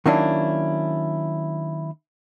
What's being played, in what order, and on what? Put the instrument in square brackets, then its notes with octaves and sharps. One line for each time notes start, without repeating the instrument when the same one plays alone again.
[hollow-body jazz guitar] D#3 F#3 A#3 C#4 D4 E4